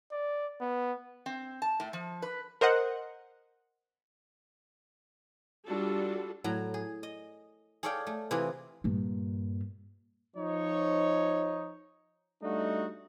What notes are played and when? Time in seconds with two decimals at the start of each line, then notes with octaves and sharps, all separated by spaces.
0.12 D5
0.61 B3
1.26 C4
1.62 A5
1.80 A2
1.93 F3
2.22 B4
2.61 A#4 C5 D#5 F#5
5.67 G3 D4 F4 F#4 A4
6.44 A2 F#3 A#5
6.74 G#4
7.03 D#5
7.83 G#4 A4 C#5 D5 F5 G5
8.07 A3
8.31 C3 E3 E4 F4 G#4
8.84 G2 A#2
10.36 F3 D#4 C#5
12.43 G3 A3 D4 D#4 F#4